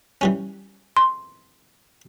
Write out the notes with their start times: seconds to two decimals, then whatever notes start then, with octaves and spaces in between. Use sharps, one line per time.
0.21 E3 G3 C#4
0.97 C6